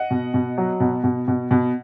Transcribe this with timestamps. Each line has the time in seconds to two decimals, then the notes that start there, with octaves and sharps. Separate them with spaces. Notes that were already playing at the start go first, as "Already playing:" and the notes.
Already playing: D#5 F#5
0.11 B2
0.34 B2
0.58 F#3
0.80 B2
1.04 B2
1.28 B2
1.51 B2